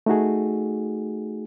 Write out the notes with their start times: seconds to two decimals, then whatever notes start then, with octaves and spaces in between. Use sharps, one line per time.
0.06 A3 D#4 F#4 G#4